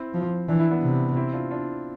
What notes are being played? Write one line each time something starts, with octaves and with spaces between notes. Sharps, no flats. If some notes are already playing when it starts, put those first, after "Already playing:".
Already playing: C4 E4
F3
E3 D4
E4
B3 D4
C3
C4 E4
D4 F4
D4 F4